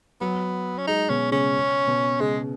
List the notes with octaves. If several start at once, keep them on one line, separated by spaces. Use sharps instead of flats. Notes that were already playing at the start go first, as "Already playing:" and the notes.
F#3 B3
C#4
G#3 D#4
B2 C#4
C#3 C#4
B2
C#3 G#3